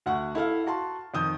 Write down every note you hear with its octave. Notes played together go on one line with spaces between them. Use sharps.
D2 F#5 C#6
E4 A4 F5 F6
F#4 A5 C6
F2 D#3 D#6 G6